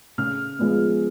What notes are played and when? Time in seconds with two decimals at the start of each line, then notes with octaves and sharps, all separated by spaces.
0.18 C#3 F6
0.59 F3 G#3 B3